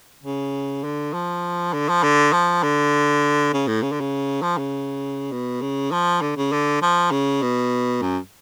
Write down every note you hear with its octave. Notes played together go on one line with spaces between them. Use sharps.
C#3
D3
F3
D3
F3
D3
F3
D3
C#3
A2
C#3
D3
C#3
F3
C#3
B2
C#3
F3
D3
C#3
D3
F3
C#3
B2
F#2